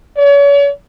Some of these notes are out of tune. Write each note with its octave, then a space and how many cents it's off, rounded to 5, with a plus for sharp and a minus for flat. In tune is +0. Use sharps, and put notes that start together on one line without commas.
C#5 +40